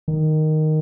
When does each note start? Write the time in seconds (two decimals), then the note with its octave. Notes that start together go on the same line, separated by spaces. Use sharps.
0.08 D#3